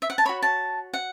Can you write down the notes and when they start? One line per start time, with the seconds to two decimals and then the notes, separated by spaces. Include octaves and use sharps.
0.02 E5
0.10 F#5
0.18 A5
0.25 F#4 C#5 B5
0.42 A5
0.93 F#5